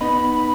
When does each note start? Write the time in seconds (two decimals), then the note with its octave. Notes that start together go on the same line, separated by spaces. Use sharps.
0.01 B3 D#4 B5